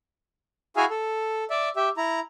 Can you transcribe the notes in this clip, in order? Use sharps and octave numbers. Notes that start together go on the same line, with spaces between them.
E4 F#4 G#4 E5 F5 G#5
A4
D5 E5
G4 E5
E4 A#5